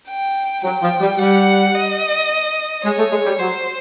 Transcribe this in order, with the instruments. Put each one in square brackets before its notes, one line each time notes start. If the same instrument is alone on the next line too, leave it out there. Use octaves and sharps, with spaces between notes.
[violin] G5
[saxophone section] F#3 [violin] G5
[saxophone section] F3
G3
[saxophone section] G3 [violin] F#5
[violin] D#5
[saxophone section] G#3 [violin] C#5
[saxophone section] A3
G#3
G3
[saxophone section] F#3 [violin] C5